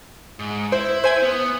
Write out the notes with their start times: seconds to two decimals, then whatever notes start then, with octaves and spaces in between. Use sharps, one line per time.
0.39 G#2
0.72 E4 C5
1.04 C5 G#5 G#6
1.23 B3